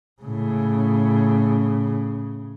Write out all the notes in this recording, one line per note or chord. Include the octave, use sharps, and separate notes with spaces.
A2 C#3